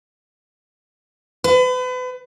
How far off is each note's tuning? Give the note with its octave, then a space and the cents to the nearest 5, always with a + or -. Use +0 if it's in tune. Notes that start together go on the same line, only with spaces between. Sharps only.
B4 +35